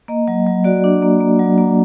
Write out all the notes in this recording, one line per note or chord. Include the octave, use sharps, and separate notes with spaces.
A#3 D#5
F#3
F#3
F#4 D5
D4
A#3
A#3
F#3
A#3